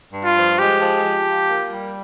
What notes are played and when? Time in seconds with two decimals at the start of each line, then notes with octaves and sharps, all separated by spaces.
0.13 G2
0.25 F4
0.36 F3
0.59 G#3 G4
0.81 F3
1.04 F3
1.26 F4
1.49 A#3
1.73 G3